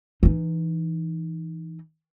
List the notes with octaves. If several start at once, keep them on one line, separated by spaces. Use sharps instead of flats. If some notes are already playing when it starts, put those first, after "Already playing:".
E3 D#4